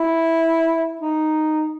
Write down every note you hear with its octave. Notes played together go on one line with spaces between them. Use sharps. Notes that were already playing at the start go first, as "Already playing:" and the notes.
Already playing: E4
D#4